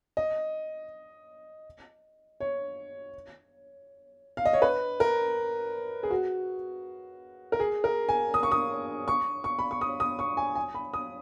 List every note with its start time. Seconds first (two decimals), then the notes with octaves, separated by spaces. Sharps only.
0.17 D#5
2.40 C#5
4.37 F5
4.45 D#5
4.53 C#5
4.62 B4
5.00 A#4
6.03 G#4
6.11 F#4
7.52 A#4
7.60 G#4
7.84 A#4
8.09 G#5
8.34 D#6
8.43 C#6
8.52 D#6
9.08 C#6
9.44 C#6
9.59 B5
9.71 C#6
9.81 D#6
10.00 D#6
10.19 C#6
10.37 G#5
10.55 G#5
10.75 B5
10.94 D#6